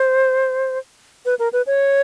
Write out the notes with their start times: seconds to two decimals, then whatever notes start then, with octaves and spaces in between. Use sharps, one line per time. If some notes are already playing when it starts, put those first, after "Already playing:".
Already playing: C5
1.25 B4
1.39 A#4
1.53 B4
1.66 C#5